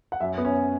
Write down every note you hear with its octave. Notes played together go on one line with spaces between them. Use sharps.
F#5
F#2 E5
B3
C#4